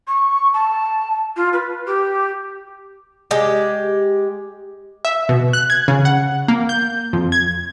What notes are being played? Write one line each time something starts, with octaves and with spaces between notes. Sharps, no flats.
C#6
A5
F4
B4
G4
G#3 G4
E5
B2
F#6
G#6
C#3
F#5
A#3
G6
F2
G#6